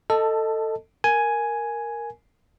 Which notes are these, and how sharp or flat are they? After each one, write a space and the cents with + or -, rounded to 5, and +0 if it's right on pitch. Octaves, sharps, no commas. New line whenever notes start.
A4 +15 D#5 +0 A5 +0
A#4 +0 G#5 +5